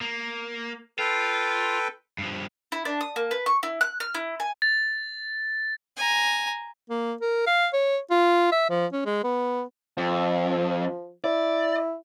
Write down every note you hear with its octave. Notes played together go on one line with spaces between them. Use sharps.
A#3
F4 A4 B4 G5
G2 F3
E4
D4
D#6
A#3
B4
C#6
E4
F#6
F6
E4
G#5
A6
G#5 A#5
A#3
A#4
F5
C#5
F4
E5
F3
C#4
G#3
B3
F2 F3
E4 D5